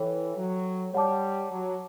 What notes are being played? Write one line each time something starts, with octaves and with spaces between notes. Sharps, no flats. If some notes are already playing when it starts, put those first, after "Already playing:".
Already playing: E3 A4 C#5 G5
F#3
G3 C#5 F#5 A5 D6
F#3